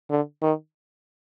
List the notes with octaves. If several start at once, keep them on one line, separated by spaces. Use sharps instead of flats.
D3
D#3